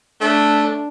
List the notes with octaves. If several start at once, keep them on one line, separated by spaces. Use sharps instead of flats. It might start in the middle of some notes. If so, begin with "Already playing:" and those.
A3 D4